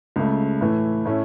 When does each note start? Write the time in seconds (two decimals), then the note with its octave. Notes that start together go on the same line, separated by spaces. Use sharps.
0.16 C#2 C#3 A3
0.61 A2 E3 A3
1.05 A2 A3 C#4 E4